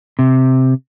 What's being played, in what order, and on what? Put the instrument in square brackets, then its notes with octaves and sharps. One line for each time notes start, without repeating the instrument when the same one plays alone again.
[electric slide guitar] C3